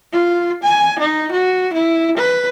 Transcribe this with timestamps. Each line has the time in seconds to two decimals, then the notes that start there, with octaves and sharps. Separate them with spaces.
0.12 F4
0.63 G#5
0.99 D#4
1.32 F#4
1.73 E4
2.17 B4